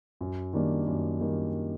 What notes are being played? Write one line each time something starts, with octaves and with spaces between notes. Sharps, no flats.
F#2
D#3 G3 A#3 D4
F#2
D#3 G3 A#3 D4